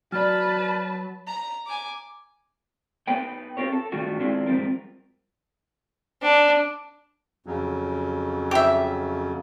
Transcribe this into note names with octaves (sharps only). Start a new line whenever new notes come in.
F#3 B4 D5 A5 F6
A#5
G#5 D6
B3 D#4 B4 G5
C4 F4 G4 A#4 C#5
A4
G2 D#3 A3 D4 F4 F#4
D#3 G#3 C4 D4 E4 F4
G#2 F3 G3 C4 F4 A#4
D4
F2 C#3 F#3
G4 E5